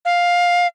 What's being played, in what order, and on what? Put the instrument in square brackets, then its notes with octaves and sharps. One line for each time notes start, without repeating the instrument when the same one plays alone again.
[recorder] F5